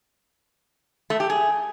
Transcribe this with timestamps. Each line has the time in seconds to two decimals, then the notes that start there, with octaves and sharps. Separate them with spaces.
1.10 A3
1.20 G4
1.30 G#4